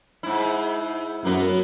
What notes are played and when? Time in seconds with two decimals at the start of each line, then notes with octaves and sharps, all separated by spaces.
0.23 G#2 E4
1.25 F#2 A#3 B3